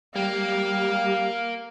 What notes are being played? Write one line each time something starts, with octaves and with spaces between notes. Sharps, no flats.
G3 A#3 G4 F5